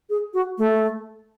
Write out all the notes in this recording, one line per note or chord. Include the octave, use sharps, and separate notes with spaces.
G#4
F#4
A3